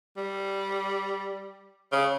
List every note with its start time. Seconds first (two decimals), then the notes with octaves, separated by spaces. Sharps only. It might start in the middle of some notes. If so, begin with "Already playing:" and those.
0.17 G3
1.92 C#3